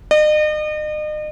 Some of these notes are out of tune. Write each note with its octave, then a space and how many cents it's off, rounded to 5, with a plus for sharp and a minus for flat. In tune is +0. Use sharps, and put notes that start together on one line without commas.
D#5 -40